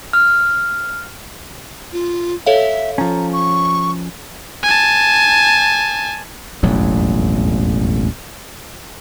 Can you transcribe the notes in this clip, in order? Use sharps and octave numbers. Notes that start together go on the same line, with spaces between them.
F6
F4
A4 C#5 E5 F5
F3 C#4 A#5
C#6
G#5 A5
E1 A1 F2 F#3